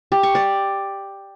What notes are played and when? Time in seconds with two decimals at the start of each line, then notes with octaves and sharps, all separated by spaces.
0.12 G4
0.23 C#6
0.35 D5